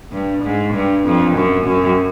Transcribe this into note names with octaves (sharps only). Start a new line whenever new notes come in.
G2
G#2
G2
F2
F#2
F#2